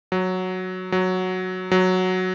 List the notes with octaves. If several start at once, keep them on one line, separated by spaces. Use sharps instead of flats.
F#3
F#3
F#3